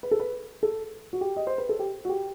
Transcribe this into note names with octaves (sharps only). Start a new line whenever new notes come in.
B4
A4
B4
A4
F#4
G4
D#5
C5
B4
A4
G4
F#4
G4